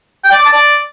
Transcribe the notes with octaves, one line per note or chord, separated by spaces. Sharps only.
G5
D5
D6
A5
D5